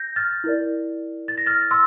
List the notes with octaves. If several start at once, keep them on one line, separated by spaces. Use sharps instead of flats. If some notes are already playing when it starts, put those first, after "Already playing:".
Already playing: G6 A#6
F6 A6
E4 A#4 D5
A6
A#6
F6 A6
C6 E6